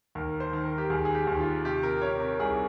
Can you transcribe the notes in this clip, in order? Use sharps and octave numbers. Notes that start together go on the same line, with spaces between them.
D#2 A#4
C5
D#3
A#4
G4
D#2 G#4
G#4
G4
D#2
F4
C3 G4
A#4
C3 C#5
A#4
C2 G#4